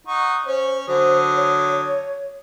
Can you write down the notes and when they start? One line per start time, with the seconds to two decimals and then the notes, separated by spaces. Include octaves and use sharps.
0.07 D#4 F#5 C#6
0.46 C#4 C5 C#5
0.88 D3 F#3 C5 D#6
1.36 C#5